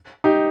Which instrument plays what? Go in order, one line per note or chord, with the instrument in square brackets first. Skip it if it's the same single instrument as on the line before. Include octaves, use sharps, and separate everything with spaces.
[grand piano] D#4 G4